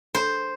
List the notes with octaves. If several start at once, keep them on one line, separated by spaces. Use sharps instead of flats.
C5